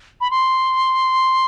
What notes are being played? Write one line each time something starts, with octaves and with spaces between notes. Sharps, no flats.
B5
C6